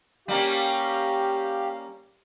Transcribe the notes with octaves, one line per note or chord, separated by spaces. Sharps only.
G3 A#3 C#4 G4 F5